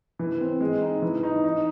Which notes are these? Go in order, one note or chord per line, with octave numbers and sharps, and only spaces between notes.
E3
C4
G#3
D#4
E3
D#4
D#4